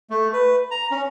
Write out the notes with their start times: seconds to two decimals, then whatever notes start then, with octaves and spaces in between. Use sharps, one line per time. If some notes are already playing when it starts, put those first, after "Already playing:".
0.10 A3
0.33 B4
0.71 A#5
0.91 C#4